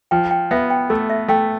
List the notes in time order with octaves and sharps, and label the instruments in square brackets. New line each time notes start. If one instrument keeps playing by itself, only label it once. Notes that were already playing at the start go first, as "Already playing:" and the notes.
[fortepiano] F3 [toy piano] G5
[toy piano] G5
[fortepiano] B3 [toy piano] E5
[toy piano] G5
[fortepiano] A3 [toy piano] A4
[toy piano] E5
[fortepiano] A3 [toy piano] G5